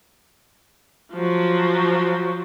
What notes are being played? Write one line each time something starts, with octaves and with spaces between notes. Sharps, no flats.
F3 F#3